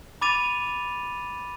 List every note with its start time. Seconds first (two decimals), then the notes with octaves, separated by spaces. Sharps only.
0.21 B5 D6 A6 D#7 F7